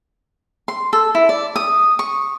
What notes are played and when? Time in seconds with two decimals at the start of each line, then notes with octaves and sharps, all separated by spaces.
0.68 C6
0.93 A4
1.15 E4
1.29 D5
1.56 D#6
1.99 C#6